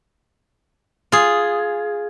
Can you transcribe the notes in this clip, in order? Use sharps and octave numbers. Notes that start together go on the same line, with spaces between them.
F4 G#4